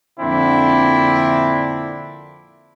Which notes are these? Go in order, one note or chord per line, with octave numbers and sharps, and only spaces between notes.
F2 A#2 D3 C4 D4 E4